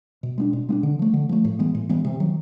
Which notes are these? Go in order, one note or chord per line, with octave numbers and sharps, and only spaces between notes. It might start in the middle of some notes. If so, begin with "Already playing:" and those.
B2
G#3 B3 D4
B2
G#3 B3 D4
D3
F3 A3
D3
F3 A3
A2
E3 G#3 B3
A2
E3 G#3 B3
C3
D#3 F#3